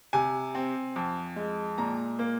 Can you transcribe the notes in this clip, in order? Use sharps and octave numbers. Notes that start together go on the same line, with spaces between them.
C3 G#5
C4
F2
G#3
A#2 A#5
A#3